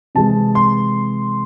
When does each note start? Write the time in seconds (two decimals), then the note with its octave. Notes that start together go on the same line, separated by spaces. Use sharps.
0.15 C3 E3 G#3 C4 A5
0.55 C6